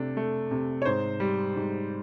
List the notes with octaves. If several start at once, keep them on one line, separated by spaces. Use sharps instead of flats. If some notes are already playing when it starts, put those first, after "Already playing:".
Already playing: C3 A3 D4
A3
C3
C#5
G#2 C5
G3
G#2